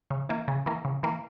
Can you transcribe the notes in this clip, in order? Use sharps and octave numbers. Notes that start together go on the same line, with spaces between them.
C#3
E3 A#3
C#3
E3 A#3
C#3
E3 A#3